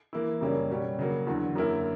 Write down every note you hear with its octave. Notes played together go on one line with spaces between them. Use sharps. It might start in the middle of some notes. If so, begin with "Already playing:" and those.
E3 A#3 E4
F#2 C#3 G3 A#3 C#4
B2 G3 C#4
C#3 F#3 A#3
E2 D3 F#3
F#2 D3 A#3 E4 A#4